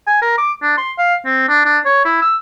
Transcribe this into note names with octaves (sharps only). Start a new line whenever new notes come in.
G#5
A#4
D6
D4
C6
F5
C4
D4
D4
C#5
E4
E6